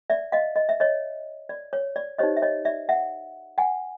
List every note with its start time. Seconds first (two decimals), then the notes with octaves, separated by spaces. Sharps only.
0.10 D5 E5
0.32 D#5 F5
0.56 D#5
0.69 E5
0.80 C#5 D#5
1.49 D5
1.73 C#5
1.96 D5
2.18 D#4 G4 C5 C#5 D#5
2.37 E5
2.42 C#5 D#5
2.65 D5 E5
2.89 E5 F#5
3.58 F#5 G#5